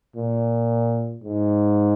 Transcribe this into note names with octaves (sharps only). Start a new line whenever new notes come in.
A#2
G#2